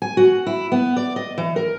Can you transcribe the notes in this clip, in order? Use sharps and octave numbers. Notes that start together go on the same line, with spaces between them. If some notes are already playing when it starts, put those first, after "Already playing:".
G#5
F#4
E4
B3
D5
D#5
E3
A#4